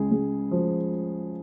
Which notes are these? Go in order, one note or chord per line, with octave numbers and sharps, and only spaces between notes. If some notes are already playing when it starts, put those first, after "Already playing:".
Already playing: C#2 C#3 G#4
C#2
F3